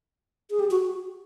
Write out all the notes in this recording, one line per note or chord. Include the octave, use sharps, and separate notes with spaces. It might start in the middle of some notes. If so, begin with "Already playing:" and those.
G#4
G4
F#4